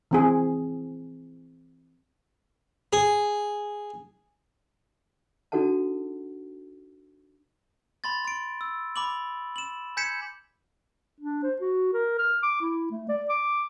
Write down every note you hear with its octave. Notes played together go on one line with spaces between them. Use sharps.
E3 C4 G#4
G#4
D4 D#4 F#4 A4 F#5 A5
B5 C6 A6
C6 D7
E6
B5 D6 F#7
E7 F#7
G#5 G6 G#6 B6 C#7 E7
D4
C5
F#4
A#4
F6
D6
E4
A3
D5
D6